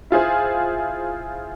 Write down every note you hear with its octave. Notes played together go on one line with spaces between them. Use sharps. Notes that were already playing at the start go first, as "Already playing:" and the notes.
E4 F4 G#4 C5